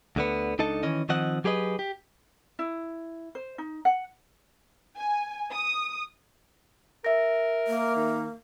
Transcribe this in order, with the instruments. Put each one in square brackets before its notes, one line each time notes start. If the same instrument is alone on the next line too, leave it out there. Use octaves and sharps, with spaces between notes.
[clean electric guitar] D2 D3 B3
C#2 D4 D#4 A4 D#5 A5
D#3 E3 C#4 D#5
D#3 F3 C4 D#5 F#5
F#3 G4 G#4 B4 D#5
G4
[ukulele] E4
C5
D#4
F#5
[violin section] G#5
D#6
[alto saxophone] A#4 [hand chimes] E5 A#6
[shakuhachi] A#3
[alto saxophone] D#3